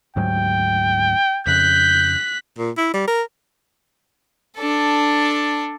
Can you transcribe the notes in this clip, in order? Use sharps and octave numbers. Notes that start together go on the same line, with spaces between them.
D2 G#2 F#3 G5
F2 C#3 F#6 G6 B6
A#2
E4
G3
A#4
D4 A4